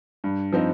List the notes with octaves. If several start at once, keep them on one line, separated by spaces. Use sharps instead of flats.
G2
F3 C4 D#4